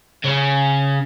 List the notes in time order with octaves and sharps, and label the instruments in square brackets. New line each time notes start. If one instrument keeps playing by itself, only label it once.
[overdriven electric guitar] C#3 C#4